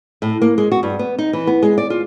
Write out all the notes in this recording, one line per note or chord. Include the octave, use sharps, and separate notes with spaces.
A2
A#3
G#3
F#4
G2
B3
D#4
E3
B3
G#3
D5
F4